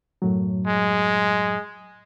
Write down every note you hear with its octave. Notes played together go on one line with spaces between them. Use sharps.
F#2 A2 F#3
G#3